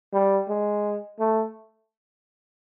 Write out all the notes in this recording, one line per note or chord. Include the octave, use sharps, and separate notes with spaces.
G3
G#3
A3